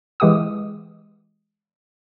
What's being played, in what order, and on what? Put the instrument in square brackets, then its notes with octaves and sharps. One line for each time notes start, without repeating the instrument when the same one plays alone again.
[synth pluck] E3 G#3 G4 F#5 D#6